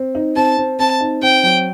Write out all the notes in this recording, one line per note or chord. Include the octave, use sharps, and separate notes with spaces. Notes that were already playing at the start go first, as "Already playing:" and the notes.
Already playing: C4
D#4
C4 A5
C4
C4 A5
D#4
C4 G5
F#3